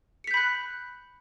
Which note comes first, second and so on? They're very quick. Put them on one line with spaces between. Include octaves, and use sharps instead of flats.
C#7 B6 G6 B5 F#6